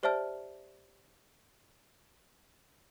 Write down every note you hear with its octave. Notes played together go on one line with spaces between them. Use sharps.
G4 C5 D5 E5 A5 F6